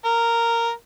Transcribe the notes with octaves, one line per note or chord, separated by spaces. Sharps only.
A#4